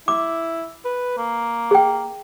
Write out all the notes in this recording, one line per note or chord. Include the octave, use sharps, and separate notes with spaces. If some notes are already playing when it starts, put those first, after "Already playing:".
E4 D6
B4
A#3
G#4 G5